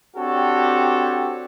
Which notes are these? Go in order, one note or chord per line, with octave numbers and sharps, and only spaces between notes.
C4 D4 F#4 G4 A4 C#5